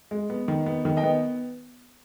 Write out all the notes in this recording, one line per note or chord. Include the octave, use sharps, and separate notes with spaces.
G#3
B3
D#3
B3
D#3
D#5 G5
B3